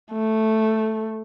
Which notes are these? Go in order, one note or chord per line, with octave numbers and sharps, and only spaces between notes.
A3